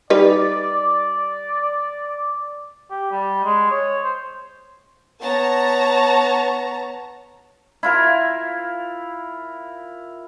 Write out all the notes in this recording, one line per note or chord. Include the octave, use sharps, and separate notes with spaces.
G3 D#4 B4 D5
G4
G3
G#3
C#5
C5
B3 C#5 A5 A#5
E4 F4 A#4